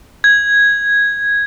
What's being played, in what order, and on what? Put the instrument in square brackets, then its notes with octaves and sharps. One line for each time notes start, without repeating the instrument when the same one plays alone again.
[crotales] G#6